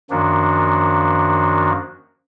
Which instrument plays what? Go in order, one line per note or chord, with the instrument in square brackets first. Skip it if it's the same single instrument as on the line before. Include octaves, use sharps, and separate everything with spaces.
[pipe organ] F#2 D#3 F3 A#3 D4 F#4